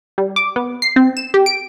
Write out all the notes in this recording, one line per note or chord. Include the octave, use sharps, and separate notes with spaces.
G3
D6
B3
C7
C4
E7
G4
D7